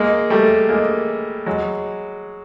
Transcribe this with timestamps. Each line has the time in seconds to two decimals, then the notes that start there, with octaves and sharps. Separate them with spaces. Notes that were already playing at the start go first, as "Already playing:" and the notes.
Already playing: G#3 A#3
0.30 G3 A3
0.69 G#3 A#3
1.46 F#3 G#3